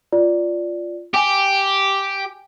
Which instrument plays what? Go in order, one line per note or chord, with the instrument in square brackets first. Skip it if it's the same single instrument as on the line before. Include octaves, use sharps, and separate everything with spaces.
[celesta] F4 D5
[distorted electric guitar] G4 [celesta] G5 G#5